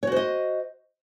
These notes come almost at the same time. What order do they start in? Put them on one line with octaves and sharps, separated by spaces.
C#5 F#4 C5 D#5